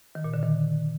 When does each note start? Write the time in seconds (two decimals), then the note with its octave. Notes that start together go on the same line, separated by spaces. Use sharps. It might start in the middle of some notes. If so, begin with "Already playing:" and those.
0.15 D#3
0.24 A#2
0.34 D3
0.43 D#3